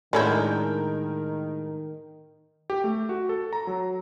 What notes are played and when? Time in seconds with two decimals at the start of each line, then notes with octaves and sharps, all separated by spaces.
0.13 A2 D3 D#3 G#3 C#4 E4 A#4 G6
2.70 G4
2.84 A3
3.09 F#4
3.29 A4
3.53 A#5
3.67 F#3